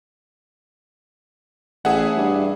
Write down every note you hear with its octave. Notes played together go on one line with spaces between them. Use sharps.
A1 G#4 E5 F#5
G2